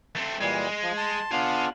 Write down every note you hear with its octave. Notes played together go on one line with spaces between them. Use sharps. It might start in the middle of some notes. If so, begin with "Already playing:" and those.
A3 C4
A#2 E3 G3 G#3
F3
A5 C6
B3 D4 F4 G#4 F5